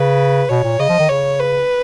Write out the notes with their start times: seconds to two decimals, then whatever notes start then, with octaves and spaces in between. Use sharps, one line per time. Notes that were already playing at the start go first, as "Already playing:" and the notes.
Already playing: C#3 B4
0.49 B2 C#5
0.64 A#2
0.79 C#3 D#5
0.89 F3
1.00 D#3
1.09 C#3 C#5
1.40 B4